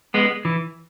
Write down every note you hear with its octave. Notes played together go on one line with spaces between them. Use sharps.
G#3 B3
E3